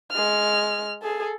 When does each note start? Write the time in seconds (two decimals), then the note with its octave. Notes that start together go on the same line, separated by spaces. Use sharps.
0.11 G#3 F6
1.02 G#4 A4